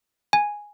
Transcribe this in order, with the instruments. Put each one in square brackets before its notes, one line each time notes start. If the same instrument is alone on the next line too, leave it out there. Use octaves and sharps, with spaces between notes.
[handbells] G#5